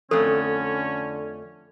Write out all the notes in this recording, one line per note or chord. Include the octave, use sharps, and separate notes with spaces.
F2 D3 A3 C#4 A4